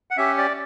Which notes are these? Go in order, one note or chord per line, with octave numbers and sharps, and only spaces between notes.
F#5
C#4 G4 E5
D5